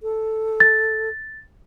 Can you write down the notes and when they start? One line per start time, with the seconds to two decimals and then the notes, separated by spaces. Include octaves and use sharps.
0.03 A4
0.60 A6